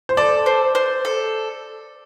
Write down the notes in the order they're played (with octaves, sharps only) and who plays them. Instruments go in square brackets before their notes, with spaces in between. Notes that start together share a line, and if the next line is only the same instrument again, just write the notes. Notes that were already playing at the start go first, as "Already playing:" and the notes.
[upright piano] C5
[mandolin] A4 [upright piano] D5
[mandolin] C5
C5
A4